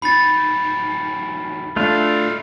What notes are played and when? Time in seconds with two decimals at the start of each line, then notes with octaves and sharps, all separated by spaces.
0.02 D2 D#4 B5 A6
1.76 D2 A3 D4 F4 F5